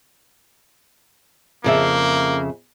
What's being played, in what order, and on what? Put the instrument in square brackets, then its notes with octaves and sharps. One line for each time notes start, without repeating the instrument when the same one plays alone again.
[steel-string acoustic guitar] F2 C#3 E5 [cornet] A#3